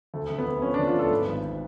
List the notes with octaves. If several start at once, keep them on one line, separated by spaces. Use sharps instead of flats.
D2 A3
D3
B3
D2
F3 C#4
D4
D3
F4
D2 A4
G#2 B4
G#1